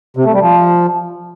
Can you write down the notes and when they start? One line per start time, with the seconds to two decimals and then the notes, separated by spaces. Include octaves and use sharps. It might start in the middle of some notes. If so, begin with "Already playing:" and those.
0.17 C3
0.25 A3
0.34 G3
0.42 F3